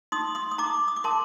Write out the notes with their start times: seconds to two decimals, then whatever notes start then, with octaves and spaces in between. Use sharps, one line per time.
0.12 D#4 C6 D#6
0.35 C6 D#6
0.51 D#6
0.58 D#4 A#5 D6
0.88 D#6
0.96 D6
1.04 A#4 A5 C6